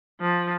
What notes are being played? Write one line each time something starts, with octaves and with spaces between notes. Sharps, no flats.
F3